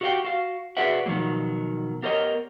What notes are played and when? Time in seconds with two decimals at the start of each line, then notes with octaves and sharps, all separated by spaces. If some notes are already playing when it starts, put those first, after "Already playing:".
0.01 F#4 G4 A#4 D#5 F5 G5
0.25 F#4 F5
0.77 F#4 G#4 B4 D5 E5 F#5
1.06 B2 D#3 F3 F#3 A#3
2.03 B3 G4 A#4 C5 C#5 D#5